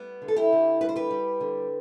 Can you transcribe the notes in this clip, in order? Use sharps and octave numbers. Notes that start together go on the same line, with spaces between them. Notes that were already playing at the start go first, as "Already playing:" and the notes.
Already playing: G3 B3
D3
A4
E4 G4
D3
G3 B4
C5
G4 B4
G3
D3